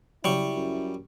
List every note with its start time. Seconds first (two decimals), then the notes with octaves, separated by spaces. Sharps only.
0.24 C#3 F#3 G3 E4 C#6
0.56 F#2